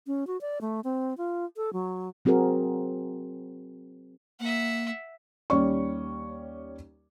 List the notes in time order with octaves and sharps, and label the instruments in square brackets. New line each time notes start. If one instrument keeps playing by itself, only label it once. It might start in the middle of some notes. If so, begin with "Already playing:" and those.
[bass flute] C#4
F#4
D5
A3
C4
F4
A4
F#3
[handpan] F#3 C4 F#4 G#4 A#4
[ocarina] A#3 [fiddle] E5 F#5
[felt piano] D#2 G3 C#4 D5 C#6